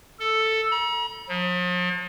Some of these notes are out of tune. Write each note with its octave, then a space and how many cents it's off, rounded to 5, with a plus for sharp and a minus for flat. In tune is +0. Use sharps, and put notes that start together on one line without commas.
A4 +5
A#5 +45
F3 +45